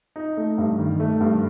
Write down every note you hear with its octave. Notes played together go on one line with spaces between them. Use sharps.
D#4
A3
G2
D#3
A3
G2